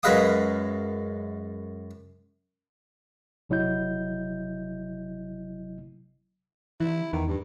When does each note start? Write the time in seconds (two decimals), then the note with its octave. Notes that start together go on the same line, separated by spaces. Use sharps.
0.03 F#2 G#3 B4 F5 D#6
3.49 G1 C3 F#3 E4 D#5 G6
6.80 E3 E4
7.13 E2 D#3
7.27 G2